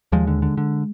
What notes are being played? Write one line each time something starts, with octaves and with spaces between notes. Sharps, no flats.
D#2 F3 G#3
D3
D3
D3